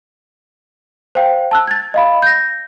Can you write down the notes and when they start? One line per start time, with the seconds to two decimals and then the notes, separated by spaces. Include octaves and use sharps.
1.15 C5 F5 G5
1.51 A5 E6 F#6
1.67 G#6 A6
1.94 D#5 F5 B5
2.22 G6 A#6